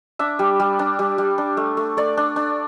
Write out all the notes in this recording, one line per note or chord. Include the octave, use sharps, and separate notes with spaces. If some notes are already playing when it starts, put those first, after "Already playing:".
D4 E5
G3
G3
D4
G3
G3
D4
A3
A3
A3 D5
D4
D4